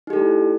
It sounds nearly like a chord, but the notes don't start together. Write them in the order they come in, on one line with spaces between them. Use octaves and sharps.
D#4 G4 A4 A3 E4